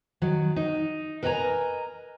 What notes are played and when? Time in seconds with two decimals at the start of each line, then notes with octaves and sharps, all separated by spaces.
0.22 D#3 F#3
0.56 D#4
1.23 A#4 B4 D#5 G5 G#5 A#5